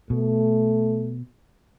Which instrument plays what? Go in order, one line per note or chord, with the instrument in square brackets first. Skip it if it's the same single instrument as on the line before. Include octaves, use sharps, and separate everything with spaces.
[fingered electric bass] B2 [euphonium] A3